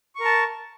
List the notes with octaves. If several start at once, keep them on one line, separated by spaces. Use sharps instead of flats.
A#4 A5 C#6